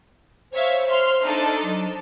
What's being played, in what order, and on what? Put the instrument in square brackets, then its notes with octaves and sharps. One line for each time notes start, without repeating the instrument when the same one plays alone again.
[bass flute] C5 [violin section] C#5 E5 F5
[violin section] C6 F6
D4 D#4 A4
[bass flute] F#3